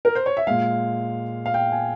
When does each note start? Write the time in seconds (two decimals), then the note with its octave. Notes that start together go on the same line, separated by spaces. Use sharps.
0.05 A#4
0.15 C5
0.26 C#5
0.37 E5
0.47 A#2 G#3 F5
1.46 F5
1.54 G5
1.72 G#5